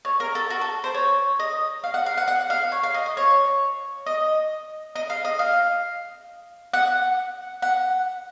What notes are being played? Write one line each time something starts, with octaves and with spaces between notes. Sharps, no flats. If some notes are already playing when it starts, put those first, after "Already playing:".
C#5
A#4
A4
F#4
A4
C5
C#5
D#5
F5
F#5
F5
F#5
F#5
F5
C#5
F5
D#5
D#5
C#5
D#5
D#5
F5
D#5
F5
F#5
F#5